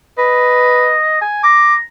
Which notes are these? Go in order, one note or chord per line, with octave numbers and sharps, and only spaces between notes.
B4 D#5
G#5
A#5 D6